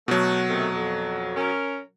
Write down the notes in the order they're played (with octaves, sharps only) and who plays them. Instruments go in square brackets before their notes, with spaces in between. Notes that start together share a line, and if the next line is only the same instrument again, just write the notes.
[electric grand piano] B2 F#3 [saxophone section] A3 F#4
[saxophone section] C3 D#3 A3
F2
C#4 A#4